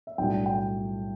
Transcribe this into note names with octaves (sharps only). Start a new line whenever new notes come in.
E5
B1 A2 G3 D4 G5
G5